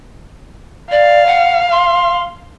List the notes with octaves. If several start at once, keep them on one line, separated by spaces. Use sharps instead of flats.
D5 F5
F#5
C6